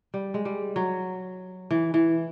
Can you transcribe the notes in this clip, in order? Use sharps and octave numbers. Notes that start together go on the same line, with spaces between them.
G3
G#3
G3
F#3
E3
E3